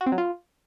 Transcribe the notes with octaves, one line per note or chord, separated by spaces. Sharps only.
F#4
C4
F#3
F4